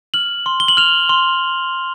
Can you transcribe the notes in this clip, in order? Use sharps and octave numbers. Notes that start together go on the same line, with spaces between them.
F6 F#7
C6
G7
F#7
F6 F7
C6